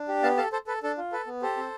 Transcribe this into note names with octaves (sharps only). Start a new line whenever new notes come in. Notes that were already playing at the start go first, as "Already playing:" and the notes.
Already playing: D4
G4
B3 F5 A5
A4 F5 A5
A4 C5
A4 B4
D4 A4
F4
A4 B4
B3
G4 A4 C5
C4